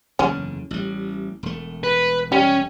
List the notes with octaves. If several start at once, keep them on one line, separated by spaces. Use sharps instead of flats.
F#1 E2 D3 C#4
A1 G3
E1 A3
B4
G3 C#4